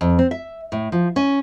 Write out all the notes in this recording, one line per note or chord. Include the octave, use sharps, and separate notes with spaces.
F2
C4
E5
A2
F3
C#4